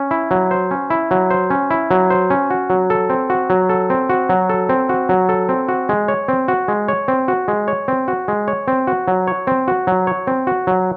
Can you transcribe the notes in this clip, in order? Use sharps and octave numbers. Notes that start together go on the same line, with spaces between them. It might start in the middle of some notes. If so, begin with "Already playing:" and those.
Already playing: C#4
E4
F#3
C5
C#4
E4
F#3
C5
C#4
E4
F#3
C5
C#4
F#4
F#3
A4
C4
F#4
F#3
A4
C4
F#4
F#3
A4
C4
F#4
F#3
A4
C4
F#4
G#3
C#5
C4
F#4
G#3
C#5
C4
F#4
G#3
C#5
C4
F#4
G#3
C#5
C4
F#4
F#3
C#5
C4
F#4
F#3
C#5
C4
F#4
F#3